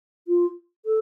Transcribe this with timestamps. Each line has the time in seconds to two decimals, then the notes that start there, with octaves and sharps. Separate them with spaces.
0.28 F4
0.85 A4